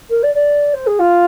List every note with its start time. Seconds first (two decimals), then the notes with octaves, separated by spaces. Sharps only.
0.10 A#4
0.23 D5
0.34 D5
0.73 C5
0.86 G#4
0.99 F4